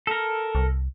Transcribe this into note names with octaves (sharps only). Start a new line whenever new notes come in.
A4 A#4
C2